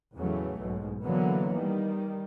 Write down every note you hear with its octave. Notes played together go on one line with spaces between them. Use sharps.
E2 A2 C#3 E3 F#3 A3
B1 G#2 B2
D3 E3 F#3 A#3 B3
D#3 G3